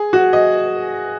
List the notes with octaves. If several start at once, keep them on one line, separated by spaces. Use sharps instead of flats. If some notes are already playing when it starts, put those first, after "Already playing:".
Already playing: G#4
F#4
D#5